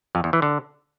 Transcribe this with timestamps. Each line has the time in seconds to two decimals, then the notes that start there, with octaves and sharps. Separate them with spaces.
0.15 F2
0.24 E2
0.33 E3
0.42 D3